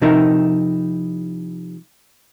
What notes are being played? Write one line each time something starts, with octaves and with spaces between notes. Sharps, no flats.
C3 F3 D#4 E4 A#4